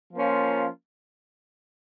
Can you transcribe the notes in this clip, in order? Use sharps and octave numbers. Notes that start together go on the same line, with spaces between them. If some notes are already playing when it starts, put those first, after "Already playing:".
F3 A#3 C#4 F4